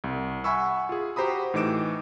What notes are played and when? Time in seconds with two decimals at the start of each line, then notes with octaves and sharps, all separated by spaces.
0.04 C2
0.44 E5 F#5 G#5 B5 C#6 E6
0.89 F4 G#4
1.16 F#4 G4 C5 A#5 B5 D#6
1.54 A2 E3 D#4 D6 D7 E7